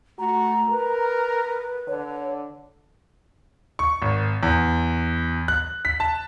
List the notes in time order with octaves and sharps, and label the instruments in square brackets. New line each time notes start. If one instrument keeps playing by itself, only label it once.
[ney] A3 [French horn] F#4 [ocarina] A#5
[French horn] A#4 [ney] B4
[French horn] D3 [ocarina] C#5
[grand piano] C#6
G#1
E2
F#6
B6
A5